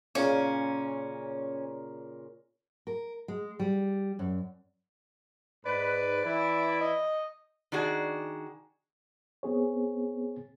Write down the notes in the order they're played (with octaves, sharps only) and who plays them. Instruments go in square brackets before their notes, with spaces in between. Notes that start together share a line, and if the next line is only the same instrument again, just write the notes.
[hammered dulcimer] A#2 C#3 A#4 [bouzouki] C#4
[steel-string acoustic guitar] A#4
G#3
G3
F#2
[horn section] G#2 B4 [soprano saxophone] D5
[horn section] E3 E4
[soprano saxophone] D#5
[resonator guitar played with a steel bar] D#3 D4 F#4 G#4
[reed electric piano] B3 C4 G#4 C#5